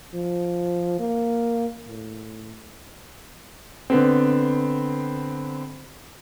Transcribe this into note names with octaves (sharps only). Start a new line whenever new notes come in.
F3
A#3
A2
D3 B3 C4